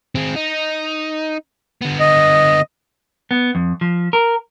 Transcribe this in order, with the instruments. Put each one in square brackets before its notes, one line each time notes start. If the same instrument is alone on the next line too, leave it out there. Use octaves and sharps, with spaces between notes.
[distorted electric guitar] C4 G#4
D#4
D3 B3
[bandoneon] D#5
[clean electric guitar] B3
F2
F3
A#4